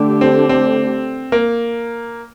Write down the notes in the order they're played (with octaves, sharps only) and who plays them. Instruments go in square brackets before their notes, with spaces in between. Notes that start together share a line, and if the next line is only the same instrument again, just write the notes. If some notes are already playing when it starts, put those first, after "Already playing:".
Already playing: [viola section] D3 A3 D4 G4
[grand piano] C4
C4
A#3